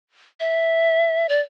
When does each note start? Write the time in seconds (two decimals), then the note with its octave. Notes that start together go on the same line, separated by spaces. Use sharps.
0.40 E5
1.29 D5